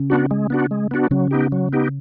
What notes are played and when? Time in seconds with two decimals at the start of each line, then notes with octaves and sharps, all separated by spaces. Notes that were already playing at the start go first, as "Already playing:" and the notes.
Already playing: C#3 C#4
0.10 B3 D4 F#4
0.31 G#3
0.50 B3 D4 F#4
0.71 G#3
0.91 B3 D4 F#4
1.11 C#3 F#3 C#4
1.31 B3 D#4 G4
1.52 F#3
1.73 B3 D#4 G4